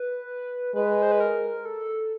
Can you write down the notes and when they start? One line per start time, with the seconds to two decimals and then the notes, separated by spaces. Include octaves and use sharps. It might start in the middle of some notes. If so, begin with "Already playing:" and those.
Already playing: B4
0.75 G#3 B4
1.02 C5
1.12 B4
1.20 A#4
1.65 A4